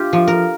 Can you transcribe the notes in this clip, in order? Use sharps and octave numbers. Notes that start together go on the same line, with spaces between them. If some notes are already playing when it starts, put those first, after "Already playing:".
Already playing: D4 F4 G4
F3
A#4